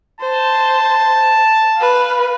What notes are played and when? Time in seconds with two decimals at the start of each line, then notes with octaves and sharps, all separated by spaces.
0.20 C5 A5
1.77 B4 F5